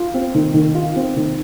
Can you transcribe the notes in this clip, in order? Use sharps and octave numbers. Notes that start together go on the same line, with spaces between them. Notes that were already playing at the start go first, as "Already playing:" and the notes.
Already playing: F4
C4
D#3
D#3
F4
C4
D#3